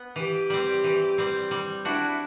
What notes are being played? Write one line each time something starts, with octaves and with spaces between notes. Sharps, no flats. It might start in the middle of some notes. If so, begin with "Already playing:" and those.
Already playing: B3
E3 G4
G3 C4
E3
G3 C4
G3
D4 E4 F#4